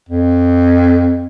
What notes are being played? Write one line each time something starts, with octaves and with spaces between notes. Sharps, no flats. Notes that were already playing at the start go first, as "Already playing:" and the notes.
F2